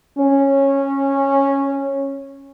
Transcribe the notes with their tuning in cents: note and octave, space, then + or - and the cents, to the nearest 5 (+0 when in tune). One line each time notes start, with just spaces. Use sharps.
C#4 -10